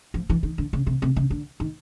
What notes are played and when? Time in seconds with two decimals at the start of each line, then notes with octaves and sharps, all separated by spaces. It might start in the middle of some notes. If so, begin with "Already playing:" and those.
0.14 F3
0.30 E3
0.43 D#3
0.58 D3
0.73 C#3
0.87 C3
1.02 C3
1.16 C#3
1.30 D3
1.60 D#3